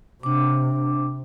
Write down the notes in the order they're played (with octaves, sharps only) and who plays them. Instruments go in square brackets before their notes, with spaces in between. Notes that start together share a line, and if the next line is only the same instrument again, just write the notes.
[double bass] C3 [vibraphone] D4 D6